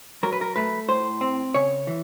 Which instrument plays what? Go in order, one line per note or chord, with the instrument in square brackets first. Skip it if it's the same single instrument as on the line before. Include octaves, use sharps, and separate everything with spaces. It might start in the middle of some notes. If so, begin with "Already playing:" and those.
[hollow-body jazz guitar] F#3 A#4
B4
A#4
A3 B4
A2 C5
C4
C#3 C#5
E3